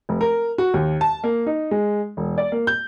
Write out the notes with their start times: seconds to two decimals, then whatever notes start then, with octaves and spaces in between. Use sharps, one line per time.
0.09 F1
0.21 A#4
0.58 F#4
0.74 D#2
1.01 A5
1.24 A#3
1.46 D#4
1.71 G#3
2.17 E1
2.38 D5
2.52 A#3
2.67 G6